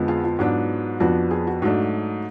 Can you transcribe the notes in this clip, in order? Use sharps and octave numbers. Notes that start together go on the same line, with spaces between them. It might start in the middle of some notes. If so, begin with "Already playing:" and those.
Already playing: F2 D3 F3 G#3 B3
F4 G#4
F4
G#2 F#3 B3 D4
F2 F3 B3 D4 F#4
F4 G#4
F#4
G#2 F#3 A3 D4 F#4